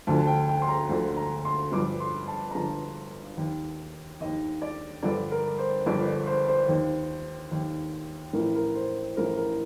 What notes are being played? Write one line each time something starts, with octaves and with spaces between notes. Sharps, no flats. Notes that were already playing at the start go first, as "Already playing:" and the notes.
D2 D3 F3 A5
A5
G5
G5
C6
A#5
D2 D3 F3
A#5
C6
G1 G2 F3 D6
C6
A5
A#5
G1 G2 F3 A5
D#2 D#3
D#2 D#3 D#5
D5
G1 G2 D3 F3 D5
A#4
C5
G1 G2 D3 F3 D5
D5
C5
C5
D#2 D#3
D#2 D#3
A1 A2 F3 A#4
A#4
C5
A1 A2 F3 A#4
A#4